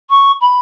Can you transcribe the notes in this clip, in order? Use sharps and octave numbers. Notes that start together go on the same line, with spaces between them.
C#6
B5